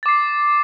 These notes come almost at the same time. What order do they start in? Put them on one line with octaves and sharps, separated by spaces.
A6 D6 C7